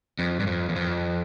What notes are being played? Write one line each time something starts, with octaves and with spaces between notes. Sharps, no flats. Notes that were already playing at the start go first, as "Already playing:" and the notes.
F2
G2
F2
E2
F2